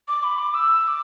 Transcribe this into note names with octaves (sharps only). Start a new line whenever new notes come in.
D6
B5
D6
E6
E6
D6